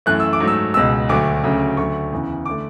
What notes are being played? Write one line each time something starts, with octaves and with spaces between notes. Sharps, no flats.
F#2 E3 A3 F#6
E6
D6
G#2 F#3 A3
E6
C#2 B2 G#3 E6
D2 D3 F#3 A3 D6
D2 C#3 F#3 A3
D2 D3 F#3 A3 C#6
E2 C#3 E3
D3 A3 D6